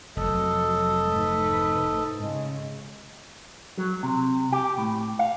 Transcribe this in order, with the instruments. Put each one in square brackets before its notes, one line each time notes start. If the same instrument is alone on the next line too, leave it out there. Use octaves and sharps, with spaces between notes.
[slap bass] F1 F2 [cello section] F#3 [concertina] A4 D#5
[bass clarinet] G#2 [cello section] A3 B4
[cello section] C#3 [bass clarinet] G#3
[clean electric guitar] F#3
C3
G4
A2
F5